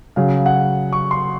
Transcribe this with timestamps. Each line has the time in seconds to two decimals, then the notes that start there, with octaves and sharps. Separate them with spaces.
0.16 C#3 F#3 F5
0.46 F#5
0.93 C#6
1.11 C6